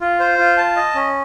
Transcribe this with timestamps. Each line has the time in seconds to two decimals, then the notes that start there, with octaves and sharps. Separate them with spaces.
0.01 F4
0.20 C5
0.38 F4
0.57 A5
0.76 D#5
0.95 C#4